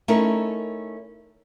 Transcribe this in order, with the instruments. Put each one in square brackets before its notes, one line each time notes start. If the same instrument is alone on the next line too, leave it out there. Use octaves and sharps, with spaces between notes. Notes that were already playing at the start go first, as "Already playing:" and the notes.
[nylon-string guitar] A3 C#4 D#4 E4 A#4